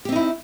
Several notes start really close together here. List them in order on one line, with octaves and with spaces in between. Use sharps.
G4 C4 D#4 E4